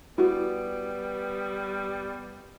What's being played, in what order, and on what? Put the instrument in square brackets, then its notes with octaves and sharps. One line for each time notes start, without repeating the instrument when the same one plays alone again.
[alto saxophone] G3 [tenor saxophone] B3 [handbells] E4 F#4